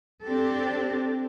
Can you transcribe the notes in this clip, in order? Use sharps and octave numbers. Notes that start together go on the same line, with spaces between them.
C4 D4 G4 A4